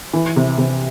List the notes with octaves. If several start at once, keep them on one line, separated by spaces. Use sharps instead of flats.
E3
C3
C3